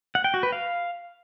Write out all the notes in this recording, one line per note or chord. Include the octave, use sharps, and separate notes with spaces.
F#5
G5
F#4
B4
F5